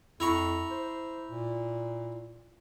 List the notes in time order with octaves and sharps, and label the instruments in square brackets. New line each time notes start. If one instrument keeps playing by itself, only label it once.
[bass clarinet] F2 [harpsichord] E4 A#5 C#6
[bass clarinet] C5
A#2